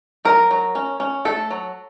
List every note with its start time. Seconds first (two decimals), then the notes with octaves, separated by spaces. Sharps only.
0.25 F#3 A#4
0.51 F#3
0.75 C#4
1.00 C#4
1.25 A3 A4
1.50 F#3